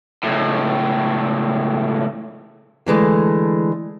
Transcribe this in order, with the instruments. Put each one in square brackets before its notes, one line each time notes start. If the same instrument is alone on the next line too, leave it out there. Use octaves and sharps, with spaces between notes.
[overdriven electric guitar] C#2 A2
[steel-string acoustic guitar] D3 E3 G#3 A3